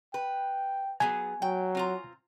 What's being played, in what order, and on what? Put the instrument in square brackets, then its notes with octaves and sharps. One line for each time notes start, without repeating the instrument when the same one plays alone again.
[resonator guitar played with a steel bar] B4 [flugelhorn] G5
[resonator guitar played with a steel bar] F#3 B3 G#4 [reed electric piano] G#5
[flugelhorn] F#3 [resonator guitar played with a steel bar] G5
[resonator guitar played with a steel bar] C4 F4 A#5